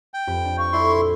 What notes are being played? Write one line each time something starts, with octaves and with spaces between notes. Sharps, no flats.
G5
F2 G4 B4
D4
F5 C#6
E4 A4 D5 C6 D6
A#1